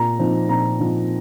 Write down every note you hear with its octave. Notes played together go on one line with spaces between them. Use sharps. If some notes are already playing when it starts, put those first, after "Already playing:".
Already playing: A#2 A#5
F3 C4 D#4
A#2 A#5
F3 C4 D#4